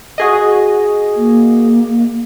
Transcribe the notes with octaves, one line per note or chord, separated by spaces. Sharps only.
F#4 G#4 D#5
A#3